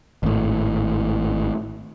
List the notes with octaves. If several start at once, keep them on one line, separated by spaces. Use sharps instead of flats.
G#1 A2